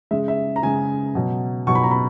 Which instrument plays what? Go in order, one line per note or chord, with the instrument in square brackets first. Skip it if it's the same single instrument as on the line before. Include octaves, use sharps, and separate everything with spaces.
[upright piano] C#3 G#3 E5
E5
A#5
C#3 G#3 G#5
B2 F#3
B2 F#3 C#6
B5
A#5
B5